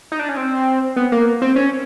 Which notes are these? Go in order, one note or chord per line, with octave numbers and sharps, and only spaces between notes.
D#4
D4
C#4
C4
B3
A#3
C4
C#4